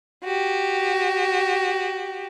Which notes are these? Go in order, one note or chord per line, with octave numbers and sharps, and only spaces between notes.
F#4 G4